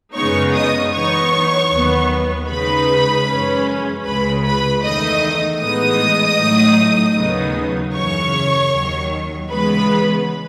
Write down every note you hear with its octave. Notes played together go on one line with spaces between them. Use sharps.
F#2 C#3 G#3 B3 D#4 C#5 C#6
D#5 D#6
F#2 E3 B3 D#4 C#5 C#6
D#2 D#3 F#3 B3
C#3 G#3 D#4 B4 B5
F#2 E3 G#3 C#4
C#2 C#3 G#3 B4 B5
B4 B5
E2 D#3 A3 D#4 D#5 D#6
A2 E3 G#3 B3 D#4 D#5 D#6
A2 F#3 A3 D#4
D#2 C#3 F#3 B3 D#4
F#2 C#3 E3 C#5 C#6
D#2 D#3 F#3
C#3 E3 G#3 B3 B4 B5